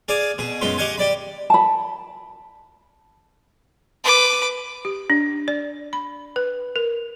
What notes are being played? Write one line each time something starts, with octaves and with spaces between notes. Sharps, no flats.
G#4 D5 F5 G#5
B2 G#4
F#2 G#3 B3 F4 C6
G4 D#5 F5 F#5 G#5
G4 D5 B5
A5 B5
B4 D6
G4
D4
D5
B5
B4
A#4